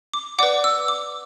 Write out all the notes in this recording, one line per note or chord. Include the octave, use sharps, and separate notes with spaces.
D6
B4 D5 F#5 D6
E6
D6